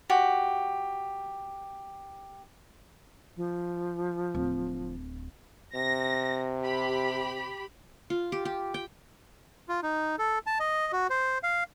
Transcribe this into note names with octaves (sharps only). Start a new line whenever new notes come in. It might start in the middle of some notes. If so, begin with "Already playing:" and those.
F#4 G4
F3
D1
C3 A#6
G4 B5
F4
G4
G4
G5
F4
D#4
A4
A5
D#5
F#4
C5
F5